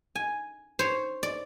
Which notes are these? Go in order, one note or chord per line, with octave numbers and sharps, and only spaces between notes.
G#5
C5 C#5
D5